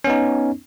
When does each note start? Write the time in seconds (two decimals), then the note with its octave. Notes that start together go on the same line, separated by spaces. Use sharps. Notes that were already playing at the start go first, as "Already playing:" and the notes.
0.04 C#4
0.07 B3
0.10 D#4